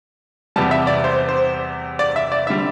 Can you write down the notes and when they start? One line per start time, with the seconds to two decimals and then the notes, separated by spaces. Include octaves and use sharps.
0.56 E2 C3 G3 A5
0.71 E5
0.87 D5
1.04 C5
1.29 C5
1.99 D5
2.16 E5
2.32 D5
2.47 E5
2.49 D3 G3